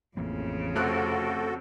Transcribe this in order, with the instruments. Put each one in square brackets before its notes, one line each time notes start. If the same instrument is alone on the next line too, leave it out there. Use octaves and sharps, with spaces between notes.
[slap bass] A1 E3 A#3 [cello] F2 C#3
[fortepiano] C3 C4 F#6 [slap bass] A3 [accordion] F#4 A4